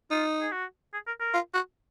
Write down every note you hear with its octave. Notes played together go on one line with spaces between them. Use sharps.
D#4 F4
G#4
F#4
G#4
A#4
A#4
F4
F#4